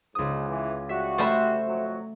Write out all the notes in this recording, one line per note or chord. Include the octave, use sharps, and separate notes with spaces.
C#2 G#2 D#6
E3
G3 F#4 E5 B6
A3 C5 D5 E5 B5
F2 F#3 F#4